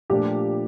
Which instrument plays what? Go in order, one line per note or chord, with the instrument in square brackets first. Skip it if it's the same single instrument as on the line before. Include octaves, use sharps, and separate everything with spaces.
[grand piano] A#2 F3 A3 D4 F4 [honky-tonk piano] G4